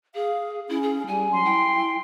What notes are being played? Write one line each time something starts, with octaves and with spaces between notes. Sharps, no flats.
G#4 F5
C#4 E4
G#4
G3 G#5
F#3 C6
E4 G5